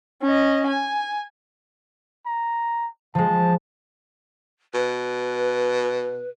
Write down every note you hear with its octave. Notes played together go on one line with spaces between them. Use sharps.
C#4 D#5
G#5
A#5
F3 G#3 A5
B2 B4